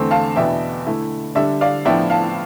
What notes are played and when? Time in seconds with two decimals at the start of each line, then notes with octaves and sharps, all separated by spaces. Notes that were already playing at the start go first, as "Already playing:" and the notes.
Already playing: E2 D3 A3 C4
0.11 F5 A5
0.36 E2 B2 B3 D4 E5 G5
0.87 D3 A3 E4
1.35 D3 G3 D4 E5
1.61 D5 F5
1.85 A2 F3 B3 D4 E5 G5
2.10 F5 A5